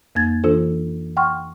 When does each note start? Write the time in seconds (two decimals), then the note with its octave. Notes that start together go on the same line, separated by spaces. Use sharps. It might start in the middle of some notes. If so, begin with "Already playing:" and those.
0.15 F2 A#3 G#6 A6
0.44 E3 D4 F4 A4 C5
1.17 F#5 G5 C6 C#6 F6